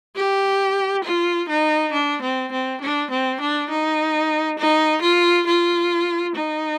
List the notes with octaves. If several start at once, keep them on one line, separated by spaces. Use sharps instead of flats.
G4
F4
D#4
D4
C4
C4
D4
C4
D4
D#4
D#4
F4
F4
D#4